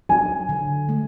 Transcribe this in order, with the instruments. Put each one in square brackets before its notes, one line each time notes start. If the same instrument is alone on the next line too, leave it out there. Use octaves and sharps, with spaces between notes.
[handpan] F#3 [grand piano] G#5
[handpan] D3
A3